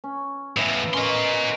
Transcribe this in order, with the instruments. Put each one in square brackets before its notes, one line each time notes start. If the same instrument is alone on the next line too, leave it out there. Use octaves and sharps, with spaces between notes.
[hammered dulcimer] C#4
[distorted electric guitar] E2 A2 [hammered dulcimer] B4 E5 F5
[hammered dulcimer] C#4 D#5 [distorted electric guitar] A#4 C6
[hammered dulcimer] F#5